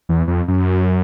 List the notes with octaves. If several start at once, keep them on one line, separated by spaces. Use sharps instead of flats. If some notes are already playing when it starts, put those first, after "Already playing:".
E2
F2
F#2